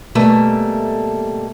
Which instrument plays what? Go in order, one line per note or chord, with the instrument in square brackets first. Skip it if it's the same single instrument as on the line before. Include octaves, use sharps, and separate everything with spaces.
[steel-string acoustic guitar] B2 G3 A3 A#3 A4 G#5